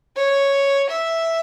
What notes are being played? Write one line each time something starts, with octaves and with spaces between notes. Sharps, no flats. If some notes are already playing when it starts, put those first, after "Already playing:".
C#5
E5